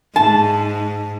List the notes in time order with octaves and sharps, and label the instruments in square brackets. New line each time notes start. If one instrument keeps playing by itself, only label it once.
[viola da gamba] G#2 [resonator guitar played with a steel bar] A5